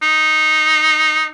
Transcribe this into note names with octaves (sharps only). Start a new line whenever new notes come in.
D#4